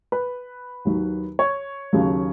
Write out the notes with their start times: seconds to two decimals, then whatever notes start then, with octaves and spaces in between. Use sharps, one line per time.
0.12 B4
0.85 D#2 D#3 F#3
1.39 C#5
1.93 D#2 C#3 F#3